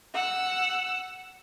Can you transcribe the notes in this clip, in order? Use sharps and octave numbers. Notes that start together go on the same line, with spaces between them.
F#5 E6